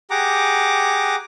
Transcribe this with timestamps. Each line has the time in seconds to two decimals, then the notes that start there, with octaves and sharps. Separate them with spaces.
0.10 G4 G#4 F#5 A#5 D6